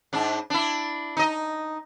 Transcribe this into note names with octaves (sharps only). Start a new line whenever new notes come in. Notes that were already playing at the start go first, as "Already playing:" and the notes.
G#2 D4
D4 E4
D#4 D#5